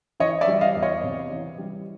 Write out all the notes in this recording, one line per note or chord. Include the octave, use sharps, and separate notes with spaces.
E3 C#5 D#5
D5 E5
G3
D#5 F5
E2
C#5 D#5
C3
E3
G3